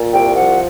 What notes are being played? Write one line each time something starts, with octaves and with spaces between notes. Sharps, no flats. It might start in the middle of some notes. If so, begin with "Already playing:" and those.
Already playing: A#2
C2 G5
F3 F#5